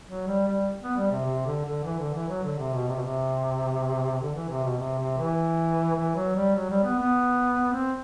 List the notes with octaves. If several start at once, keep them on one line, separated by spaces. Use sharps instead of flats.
F#3
G3
G3
B3
G3
C3
C3
D3
D3
E3
D3
E3
F#3
D3
C3
B2
C3
B2
C3
D3
E3
C3
B2
C3
C3
E3
E3
F#3
G3
F#3
G3
B3
B3
C4